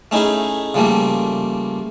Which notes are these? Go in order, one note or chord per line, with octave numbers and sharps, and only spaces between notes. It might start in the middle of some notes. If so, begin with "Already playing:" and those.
A3 C#4 D#4 E4 G#4
C#3 F3 G3 A3 A#3